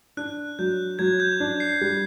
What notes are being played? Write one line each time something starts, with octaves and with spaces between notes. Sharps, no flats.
D4 F#6
F#3 G6
F#3 G#6
G6
D4
C7
G3